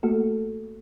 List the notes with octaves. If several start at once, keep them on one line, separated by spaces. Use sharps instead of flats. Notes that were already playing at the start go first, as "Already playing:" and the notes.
A3 A#3 F#4 A4